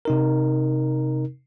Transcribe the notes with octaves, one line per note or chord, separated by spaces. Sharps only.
C3 D#4 A#4